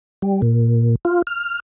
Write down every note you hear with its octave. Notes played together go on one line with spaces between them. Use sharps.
G3
A#2
F4
F6